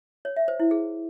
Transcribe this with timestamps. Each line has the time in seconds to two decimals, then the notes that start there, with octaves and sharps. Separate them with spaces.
0.25 C#5
0.36 E5
0.48 C5
0.60 E4
0.71 G#4